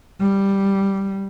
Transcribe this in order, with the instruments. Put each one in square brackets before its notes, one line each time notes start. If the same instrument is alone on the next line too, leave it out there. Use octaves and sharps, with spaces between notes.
[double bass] G3